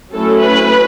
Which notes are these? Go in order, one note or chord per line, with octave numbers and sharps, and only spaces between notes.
F#3 A3 C#4 E4 A4
B4